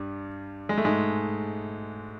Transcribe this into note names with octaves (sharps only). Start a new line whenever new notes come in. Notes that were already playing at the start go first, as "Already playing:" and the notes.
Already playing: G2 G3
G#3
A3
G#2 G#3